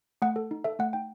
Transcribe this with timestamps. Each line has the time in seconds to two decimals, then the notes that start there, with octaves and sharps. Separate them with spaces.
0.22 A3 F#5
0.36 A4
0.51 D#4
0.64 A4 E5
0.79 A3 F#5
0.93 D#4 G5